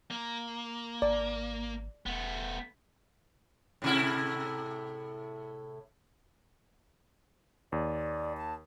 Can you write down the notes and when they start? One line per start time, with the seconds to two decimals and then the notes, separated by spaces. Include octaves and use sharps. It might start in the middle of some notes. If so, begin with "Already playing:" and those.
0.11 A#3
1.02 G#1 D5
2.06 E1 A3 B3
3.82 A2 C3 E4
7.72 D#2 D5
8.37 A5